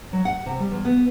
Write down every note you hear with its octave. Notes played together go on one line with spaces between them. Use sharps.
F#3
F#5
C3
G3
E2
B3